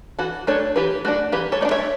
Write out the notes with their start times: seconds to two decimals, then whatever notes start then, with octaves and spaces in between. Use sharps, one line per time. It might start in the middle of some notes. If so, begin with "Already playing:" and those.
0.19 E3 F#4 A4
0.47 A3 D4 A4 C#5
0.76 E3 G4 B4
1.05 A3 D4 F#4 A4
1.32 E3 G4 B4
1.52 A4 C#5
1.61 A3 D5
1.65 D4
1.71 C#5 E5